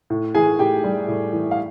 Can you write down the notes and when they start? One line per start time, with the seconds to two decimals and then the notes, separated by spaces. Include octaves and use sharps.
0.10 A2
0.35 E3 G#4 G#5
0.59 A2 G4 G5
0.84 G3
1.08 A2
1.33 E3
1.51 F5